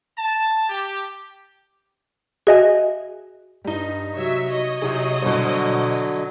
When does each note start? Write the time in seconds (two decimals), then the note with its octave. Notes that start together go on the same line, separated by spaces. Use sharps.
0.17 A5
0.69 G4
2.47 F#4 G#4 D#5 E5 G#5
3.65 G2 G3 D#4
4.16 C3 F#3 C#5 E5
4.50 C#5 D#5
4.82 C3 F#3 D#4 G#4
5.22 B2 D3 F#3 G3 C5